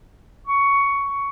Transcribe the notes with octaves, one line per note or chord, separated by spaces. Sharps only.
C#6